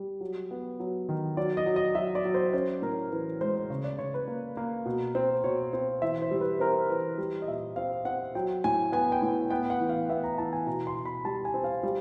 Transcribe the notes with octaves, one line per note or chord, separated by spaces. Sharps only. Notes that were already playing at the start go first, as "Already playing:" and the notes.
Already playing: G3
F#3
B3
F#3
D#3
F#3 D5
D#5
F#3
D#5
F#3 E5
D5
F#3
C5
C#4 C5
A2 A#4
E3 B4
G#3 C5
C#3 C#5
D5
C#3 C#5
B4
A#3
A#3
B2
C4
B2 C#5
C4
E3 E5
C5
G3
B4
C4 A#4
E3 B4
G3
D#5
A#2 E5
C4 F5
C4 F#5
F#3 G5
A2 G#5
B3 G#5
G5
A2
B3 G5
F#5
E3
F5
B3 E5
A#5
E3 A5
G#5
B2 A#5
C6
B2
B5
G3 A5
G#5
C4
F5
G3